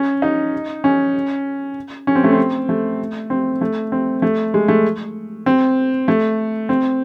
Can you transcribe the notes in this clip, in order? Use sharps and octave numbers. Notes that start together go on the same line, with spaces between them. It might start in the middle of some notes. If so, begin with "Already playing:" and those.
Already playing: C#4
D#4
C#4
C#4
C4
A3
C4
A3
C4
A3
C4
A3
G#3
A3
C4
A3
C4